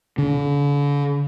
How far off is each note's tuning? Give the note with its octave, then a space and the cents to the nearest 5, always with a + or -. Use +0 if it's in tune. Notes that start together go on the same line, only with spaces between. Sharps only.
D3 -45